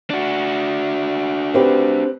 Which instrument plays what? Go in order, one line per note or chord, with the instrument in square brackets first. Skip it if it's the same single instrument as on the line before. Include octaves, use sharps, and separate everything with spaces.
[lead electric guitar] D4 F#4
[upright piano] C4 G4 B4